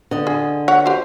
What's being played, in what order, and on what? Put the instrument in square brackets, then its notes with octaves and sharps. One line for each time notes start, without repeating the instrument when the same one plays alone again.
[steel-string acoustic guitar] D3 D#5
[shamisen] G#4
C#5 F#5
G4 C5